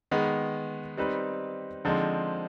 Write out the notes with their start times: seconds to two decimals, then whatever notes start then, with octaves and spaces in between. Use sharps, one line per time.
0.11 D#3 G#3 B3
0.97 G3 C4 D#4 B4
1.85 D3 F3 G#3 C4 D#4